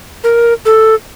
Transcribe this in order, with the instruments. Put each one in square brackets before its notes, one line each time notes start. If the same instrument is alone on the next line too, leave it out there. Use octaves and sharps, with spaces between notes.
[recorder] A#4
A4